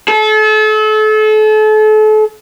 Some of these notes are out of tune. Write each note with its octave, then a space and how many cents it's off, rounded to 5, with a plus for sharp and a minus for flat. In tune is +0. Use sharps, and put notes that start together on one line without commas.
A4 -35